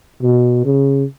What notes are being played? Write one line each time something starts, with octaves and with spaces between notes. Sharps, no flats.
B2
C#3